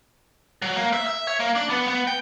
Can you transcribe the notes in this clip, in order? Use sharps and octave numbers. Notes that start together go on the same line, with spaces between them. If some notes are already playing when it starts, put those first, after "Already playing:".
F#3
A#3
E5
E5
C#5
A#3
D4
B3
B3
G5